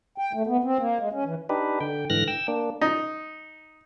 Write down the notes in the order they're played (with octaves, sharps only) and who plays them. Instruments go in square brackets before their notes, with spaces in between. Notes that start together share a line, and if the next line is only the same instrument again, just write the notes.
[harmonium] G5
A3
B3
C4
A#3
G#3
C#4
E3
[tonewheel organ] D4 D#4 G4 B4
D3 G5
G#2 D3 E3 F6 F#6 A#6
G5 E6
A#3 D4
[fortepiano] D#4